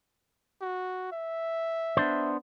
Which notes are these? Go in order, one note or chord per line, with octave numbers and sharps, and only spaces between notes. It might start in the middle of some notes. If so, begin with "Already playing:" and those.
F#4
E5
B3 D4 C5